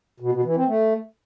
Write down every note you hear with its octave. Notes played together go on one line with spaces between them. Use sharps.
B2
B2
E3
C4
A3